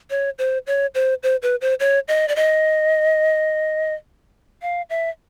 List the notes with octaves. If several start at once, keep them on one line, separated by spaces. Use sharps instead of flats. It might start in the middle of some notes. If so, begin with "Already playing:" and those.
C#5
C5
C#5
C5
C5
B4
C5
C#5
D#5
D5
D#5
F5
E5